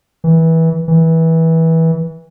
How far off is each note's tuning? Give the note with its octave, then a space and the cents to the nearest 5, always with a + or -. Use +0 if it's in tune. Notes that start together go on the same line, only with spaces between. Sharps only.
E3 -20
E3 -20